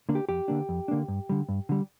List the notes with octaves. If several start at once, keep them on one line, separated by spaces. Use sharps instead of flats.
D3 A#3 D4
G4
F2 G4
D3 A#3 D4
F2
D3 A#3 D4
G2
D3 G3
G2
D3 G3